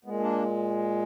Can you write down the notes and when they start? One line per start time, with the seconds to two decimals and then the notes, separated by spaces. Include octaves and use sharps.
0.04 A#2 G#3 B3
0.20 A#3 D4